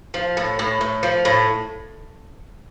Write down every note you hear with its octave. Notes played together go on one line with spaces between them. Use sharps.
F3
A2
A2
A2
F3
A2